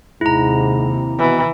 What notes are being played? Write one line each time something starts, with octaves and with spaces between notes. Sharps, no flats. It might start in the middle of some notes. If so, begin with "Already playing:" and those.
D#2 G#2 C3 E4 A#5
B2 E3